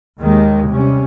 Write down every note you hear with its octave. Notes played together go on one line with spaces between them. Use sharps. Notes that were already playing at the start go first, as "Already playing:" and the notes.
D#2 D#3 G#3
C3 G3 C#4